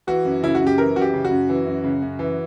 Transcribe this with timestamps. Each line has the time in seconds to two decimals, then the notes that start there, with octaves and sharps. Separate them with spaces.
0.07 E3 F#4
0.25 F#2
0.42 C#3 E4
0.55 F#4
0.61 F#2
0.67 G4
0.78 E3 A#4
0.96 F#2 F#4
1.01 G4
1.13 C#3
1.25 F#4
1.31 F#2
1.49 E3
1.66 F#2
1.84 C#3
2.02 F#2
2.19 E3